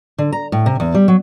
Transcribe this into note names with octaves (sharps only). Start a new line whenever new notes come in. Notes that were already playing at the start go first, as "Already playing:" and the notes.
D3
A#5
A2
C3
E2
G3
F#3